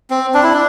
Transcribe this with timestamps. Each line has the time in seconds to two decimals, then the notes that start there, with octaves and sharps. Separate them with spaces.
0.10 C4
0.34 D4
0.43 E4
0.53 D4